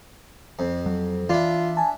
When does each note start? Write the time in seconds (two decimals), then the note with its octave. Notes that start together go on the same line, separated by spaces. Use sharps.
0.59 F2
0.86 F#3
1.29 E3 D4 E4 F4
1.77 G#5 A5